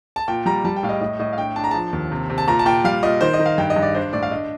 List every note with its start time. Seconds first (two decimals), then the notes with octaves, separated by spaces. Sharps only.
0.16 A5
0.28 A#2 G5
0.46 G3 A#5
0.64 G3 A5
0.76 G5
0.83 A2 F5
0.89 D#5
1.01 A2 D#5
1.19 A2 D#5
1.33 F5
1.37 D4 G5
1.56 D4 A5
1.64 A#5
1.71 F3 A5
1.93 D#2
2.11 C3
2.30 C3
2.38 A5
2.48 A#2 A#5
2.59 A5
2.66 A#2 G5
2.84 G3 F5
3.03 A#2 D#5
3.21 D#3 C5
3.34 D#5
3.39 D#3
3.46 F5
3.58 G2 G5
3.70 D#5
3.76 G2
3.82 D5
3.95 D4 C5
4.13 A2 D5
4.23 F5
4.31 D4 D#5